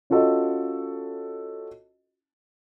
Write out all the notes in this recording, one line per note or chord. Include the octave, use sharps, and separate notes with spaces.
C#4 F4 F#4 A4 D#5